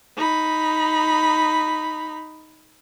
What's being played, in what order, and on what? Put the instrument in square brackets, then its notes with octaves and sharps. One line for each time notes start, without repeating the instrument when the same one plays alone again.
[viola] D#4 B5